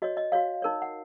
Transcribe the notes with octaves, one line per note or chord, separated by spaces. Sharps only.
F#4 C#5 D#5
D#5
F#4 C#5 F5
D#4 A#4 C#5
F#5